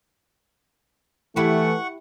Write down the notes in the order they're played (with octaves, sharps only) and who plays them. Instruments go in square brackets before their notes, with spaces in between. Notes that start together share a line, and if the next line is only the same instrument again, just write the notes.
[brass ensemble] E3 [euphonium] A3 [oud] E4 G4 [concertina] F#5 C#6